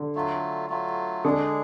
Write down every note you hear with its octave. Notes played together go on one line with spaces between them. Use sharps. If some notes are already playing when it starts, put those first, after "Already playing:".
Already playing: D3
F#3 A3 F4
F#3 A3 F4
D3 G#3 D4 G#4